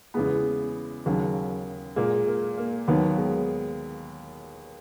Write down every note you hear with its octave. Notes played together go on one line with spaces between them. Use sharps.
E2 C#3 G#3 B3
D#2 C#3 F#3
A#2 G#3 A#3
A#3
A#3
D#2 D#3 F#3 B3
G#3